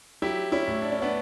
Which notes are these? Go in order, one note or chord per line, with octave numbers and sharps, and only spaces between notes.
F#3 E4 G4
C#4 E4
A2
D4
C#4
B3 D4